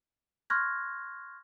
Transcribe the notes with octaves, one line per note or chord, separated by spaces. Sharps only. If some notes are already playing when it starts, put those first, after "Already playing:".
C6 C#6 F6 F#6 G#6 A#6